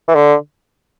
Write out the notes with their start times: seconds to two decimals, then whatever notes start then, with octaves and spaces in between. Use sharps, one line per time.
0.08 E3
0.15 D3